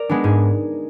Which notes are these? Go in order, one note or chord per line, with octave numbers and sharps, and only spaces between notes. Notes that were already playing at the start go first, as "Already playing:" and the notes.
Already playing: A#4 D5
G#3 B3 D4
G#2 G#4